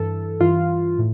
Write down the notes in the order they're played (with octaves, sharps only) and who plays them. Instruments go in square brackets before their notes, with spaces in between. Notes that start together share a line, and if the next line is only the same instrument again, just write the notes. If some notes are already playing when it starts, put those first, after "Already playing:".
Already playing: [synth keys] G2 E3 A4
G2 E3 F4
A2